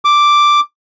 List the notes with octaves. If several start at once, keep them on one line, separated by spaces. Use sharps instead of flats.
D6